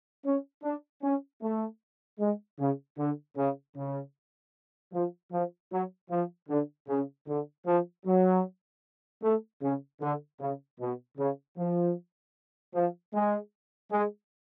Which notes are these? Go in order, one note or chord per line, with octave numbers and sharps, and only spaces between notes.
C#4
D4
C#4
A3
G#3
C#3
D3
C#3
C#3
F3
F3
F#3
F3
D3
C#3
D3
F3
F#3
A3
C#3
D3
C#3
B2
C#3
F3
F3
G#3
G#3